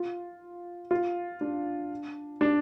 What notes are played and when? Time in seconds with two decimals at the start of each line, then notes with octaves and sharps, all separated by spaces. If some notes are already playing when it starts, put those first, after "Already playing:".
Already playing: F4
0.91 F4
1.41 D4
2.41 D4